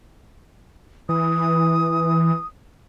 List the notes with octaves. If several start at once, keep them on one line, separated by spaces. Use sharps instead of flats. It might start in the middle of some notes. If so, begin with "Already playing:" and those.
E3 D#6